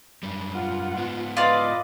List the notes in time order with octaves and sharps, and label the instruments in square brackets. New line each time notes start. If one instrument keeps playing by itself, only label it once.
[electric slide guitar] F#2 G3
[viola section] F4 F#5
[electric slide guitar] G#2 B3
[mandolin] F4 D5 [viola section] B4 D#5